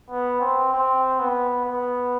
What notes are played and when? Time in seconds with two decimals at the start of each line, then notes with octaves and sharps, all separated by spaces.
0.10 B3
0.41 C4
0.73 C4
1.19 B3
1.65 B3